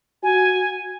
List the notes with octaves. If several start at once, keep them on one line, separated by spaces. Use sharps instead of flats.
F#4 G#5